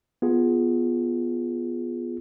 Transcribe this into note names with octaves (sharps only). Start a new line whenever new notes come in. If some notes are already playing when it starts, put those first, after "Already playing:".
B3 F4 G#4